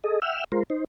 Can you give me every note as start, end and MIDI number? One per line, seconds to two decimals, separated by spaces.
0.04 0.20 68
0.04 0.20 69
0.04 0.20 75
0.22 0.44 76
0.22 0.44 78
0.22 0.44 79
0.22 0.44 88
0.22 0.44 89
0.52 0.63 56
0.52 0.63 65
0.52 0.63 70
0.52 0.63 72
0.70 0.84 63
0.70 0.84 72